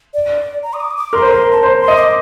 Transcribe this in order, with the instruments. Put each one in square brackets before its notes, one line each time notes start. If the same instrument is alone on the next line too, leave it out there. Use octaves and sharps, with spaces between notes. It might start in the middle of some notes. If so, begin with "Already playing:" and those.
[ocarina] D5
A#5
D#6
D6
D#6
D6
[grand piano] A#4 [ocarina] C6
[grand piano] C5
A#4
[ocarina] A5
[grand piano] C5 [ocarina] A#5
[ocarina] C6
[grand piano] D#5
[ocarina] D6